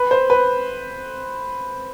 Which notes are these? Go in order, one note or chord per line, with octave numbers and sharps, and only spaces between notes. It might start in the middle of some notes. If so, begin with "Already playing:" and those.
Already playing: B4
C5
B4